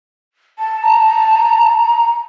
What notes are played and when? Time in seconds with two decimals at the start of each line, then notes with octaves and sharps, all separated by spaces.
0.59 A5
0.82 A5 A#5